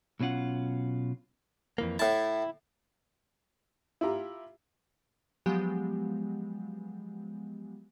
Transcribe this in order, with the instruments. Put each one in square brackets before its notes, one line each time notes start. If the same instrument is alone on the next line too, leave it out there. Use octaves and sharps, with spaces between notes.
[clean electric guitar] B1 B2 C#4 F4 F#5
F2 E3 A#3
[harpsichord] A2 A5 [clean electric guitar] E4
[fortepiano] E4 F4 G4 A#5
[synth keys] F3 F#3 G#3 B3 G4